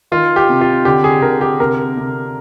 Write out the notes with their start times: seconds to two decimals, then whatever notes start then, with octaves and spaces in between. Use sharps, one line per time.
0.11 D#3 F4
0.36 G4
0.49 C3
0.61 F4
0.85 D3 G4
1.04 G#4
1.22 D3 A#4
1.41 G4
1.59 C3 A#4
1.97 C3